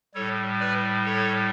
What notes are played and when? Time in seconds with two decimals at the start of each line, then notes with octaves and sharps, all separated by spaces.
0.14 A2 G3 A4 C#5
0.60 B4 D5
1.05 A4 C#5